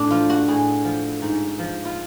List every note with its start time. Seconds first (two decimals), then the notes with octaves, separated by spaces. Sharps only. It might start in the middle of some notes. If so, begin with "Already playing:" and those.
Already playing: A2 D4
0.11 F3 F4
0.30 F#4
0.47 A2 G#4
0.84 F3
1.22 G#2
1.59 F3
1.85 F4